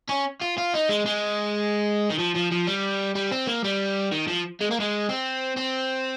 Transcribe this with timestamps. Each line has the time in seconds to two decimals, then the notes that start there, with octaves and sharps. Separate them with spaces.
0.09 C#4
0.42 F4
0.58 F4
0.74 D#4
0.89 G#3
1.06 G#3
2.10 D#3
2.19 F3
2.35 F3
2.51 F3
2.67 G3
3.15 G3
3.32 C4
3.47 A#3
3.64 G3
4.12 D#3
4.28 F3
4.61 G#3
4.71 A#3
4.80 G#3
5.09 C4
5.57 C4